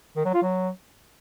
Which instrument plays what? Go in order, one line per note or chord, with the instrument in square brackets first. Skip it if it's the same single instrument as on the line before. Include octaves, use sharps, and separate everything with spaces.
[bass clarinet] D#3
F#3
F4
F#3